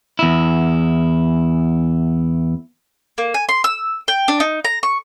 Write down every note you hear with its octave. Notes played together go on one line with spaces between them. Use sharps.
E2 E4
A#3
G#5
C6
E6
G5
D4
D#4
A#5
C#6